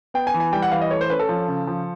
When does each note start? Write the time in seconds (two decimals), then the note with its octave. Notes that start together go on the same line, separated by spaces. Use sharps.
0.14 B3 G5
0.27 G#5
0.34 E3
0.40 G#5
0.53 G3 G5
0.62 F#5
0.72 E3 F5
0.81 D#5
0.91 A3 C#5
1.01 C5
1.10 C#4 B4
1.19 A4
1.29 F3
1.48 C#3
1.67 F3